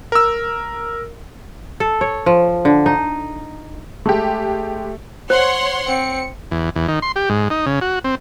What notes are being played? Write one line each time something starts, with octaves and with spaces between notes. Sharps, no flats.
A#4 E6
A4
C#5
F3
D3
D#4
G#3 A3 G4
C5 C#5 F#5 C6
C4 C#7
E2
E2
D#3
C6
G4
G#2
D#4
C#3
F#4
C4